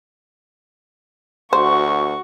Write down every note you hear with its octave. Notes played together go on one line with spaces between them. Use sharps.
D2 F#4 C5 C#6